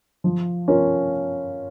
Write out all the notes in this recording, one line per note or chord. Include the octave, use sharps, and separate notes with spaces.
F3
C#4 F4 A#4